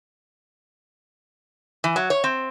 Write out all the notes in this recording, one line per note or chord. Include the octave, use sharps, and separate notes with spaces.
E3
F#3
C#5
C4